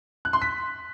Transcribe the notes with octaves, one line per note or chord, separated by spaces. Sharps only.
F#6
C6
B6